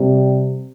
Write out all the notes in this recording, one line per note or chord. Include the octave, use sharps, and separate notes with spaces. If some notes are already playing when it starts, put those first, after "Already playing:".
Already playing: C3 G3